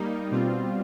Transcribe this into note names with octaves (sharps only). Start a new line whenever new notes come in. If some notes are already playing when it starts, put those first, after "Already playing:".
Already playing: G3 A#3 D#4
B2 G3 C4 F4